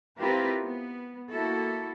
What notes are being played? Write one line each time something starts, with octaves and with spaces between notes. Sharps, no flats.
C4 E4 F4 G4 A#4 B4
B3
A#3 E4 F#4 A4